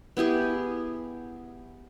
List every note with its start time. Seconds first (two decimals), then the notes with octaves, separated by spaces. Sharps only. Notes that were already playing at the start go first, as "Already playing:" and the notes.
0.17 B3 E4 G4 G#4